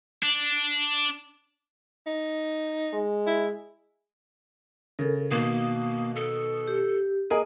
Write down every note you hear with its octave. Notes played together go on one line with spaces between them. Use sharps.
D4
D#4
G#3
E4
C#3 A4 A#4
B2 D#3 A#3 D#6
A4
G4
A#3 G#4 A#4 D#5 D#6